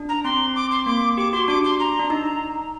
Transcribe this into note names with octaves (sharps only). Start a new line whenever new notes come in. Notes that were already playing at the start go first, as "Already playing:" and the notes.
Already playing: D4
A#5
C4 C6
D6
C6
A#3 D6
G4 D6
F#4 C6
D4 D6
C6
A#5
D4
D#4